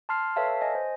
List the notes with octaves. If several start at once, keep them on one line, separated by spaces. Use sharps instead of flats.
A5 C6 F6 C7
A4 B4 C#5 E5 F5 A5
D#5 G#5
C5